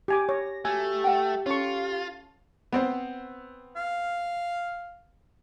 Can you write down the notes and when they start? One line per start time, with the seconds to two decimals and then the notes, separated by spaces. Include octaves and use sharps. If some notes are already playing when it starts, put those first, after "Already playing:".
0.08 G4 G#5 D6
0.29 C#5 A#6
0.65 A3 F#4 G4 G#5
1.04 F#5 G5
1.46 C#4 F4 A4 C#5 C#6
2.73 B3 C4 C5
3.76 F5